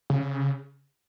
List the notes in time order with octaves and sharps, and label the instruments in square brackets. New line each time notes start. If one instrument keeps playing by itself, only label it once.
[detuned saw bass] C#3